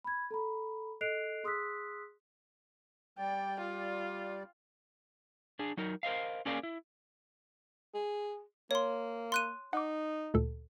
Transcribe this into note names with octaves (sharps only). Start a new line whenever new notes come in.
B5 G#6
A4 A#5 B5
A4 D#5 F#6 C7 D7 F7
G#4 C6 D#6 E6 F#6 B6
G3 D5 G5
F4
D4 G#4
F#3 D#4 A#4
A#4 C5 D#5 F5
A#3 C#4 G#4 A#4 D5 F5
E4
G#4
A#3 C#5 C6
C6 F#6 D#7
D#4 F#5 D6
D2 A#2 A4